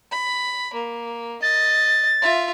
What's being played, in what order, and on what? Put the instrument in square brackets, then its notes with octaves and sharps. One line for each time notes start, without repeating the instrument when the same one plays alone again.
[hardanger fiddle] B5
A#3
[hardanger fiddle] D#5 [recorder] A6
[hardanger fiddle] F4 E5